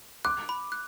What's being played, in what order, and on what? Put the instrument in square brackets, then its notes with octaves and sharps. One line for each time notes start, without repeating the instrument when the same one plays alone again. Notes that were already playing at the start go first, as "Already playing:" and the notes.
[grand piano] D6 [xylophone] F#6
[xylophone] B5
F#6